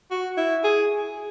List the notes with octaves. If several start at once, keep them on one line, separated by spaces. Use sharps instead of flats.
F#4
E4
G#4